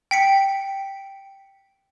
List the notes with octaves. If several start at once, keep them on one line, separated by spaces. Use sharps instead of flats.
G5 B6 C#7